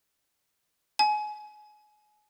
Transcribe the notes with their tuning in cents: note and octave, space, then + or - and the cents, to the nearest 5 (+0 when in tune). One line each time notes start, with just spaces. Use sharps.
G#5 +25